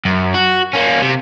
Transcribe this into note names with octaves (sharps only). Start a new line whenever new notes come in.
F#2
F#4
A#3 C#4
C3